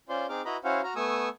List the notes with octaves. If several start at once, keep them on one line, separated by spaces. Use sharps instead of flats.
C#4 F4 C5 D5 C6
C4 D#4 G#4 D6 F6
E4 F#4 B4 D#5 A#5 B5
C#4 E4 F#4 C5 F5 F#5
F#4 A#5 F6
A3 B3 G#5 C#6 D#6 E6